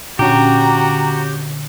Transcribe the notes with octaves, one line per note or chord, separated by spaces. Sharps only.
A#2 D3 C#4 F#4 G4 A#5